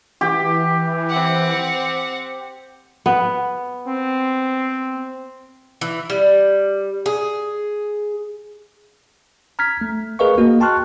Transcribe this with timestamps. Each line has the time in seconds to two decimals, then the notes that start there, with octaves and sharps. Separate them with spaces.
0.21 E3 G4
1.09 C4 F#5
3.06 B3
3.88 C4
5.81 E3
6.10 G3
7.06 G#4
9.59 A#5 F6 G#6 B6
9.81 A3
10.19 G#4 A#4 B4 D#5 F5 C#6
10.38 A#3 F#4 D#5
10.60 G5 A5 C6 C#6 F6 F#6